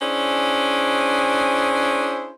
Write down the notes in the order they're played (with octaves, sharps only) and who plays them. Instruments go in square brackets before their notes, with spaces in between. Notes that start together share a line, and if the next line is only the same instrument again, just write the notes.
[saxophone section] C#4 D4 E4 G#4 C5